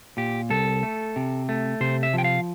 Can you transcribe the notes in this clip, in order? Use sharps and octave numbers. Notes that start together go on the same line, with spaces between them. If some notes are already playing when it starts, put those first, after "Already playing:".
A#2 G4
C2 A4
A3
C3
A3
C3 C5
E5
F3 G5
F5